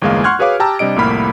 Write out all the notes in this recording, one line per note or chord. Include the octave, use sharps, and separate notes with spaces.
G1 E2 G#3 A#3 F5
F#5 C6 C#6 F6 F#6 G#6
F#4 G#4 B4 C#5 F5 D6
G4 G5 A5 A#5 E6
C3 G3 D4 D#5 D7
C2 F2 A2 A#3 B5 F6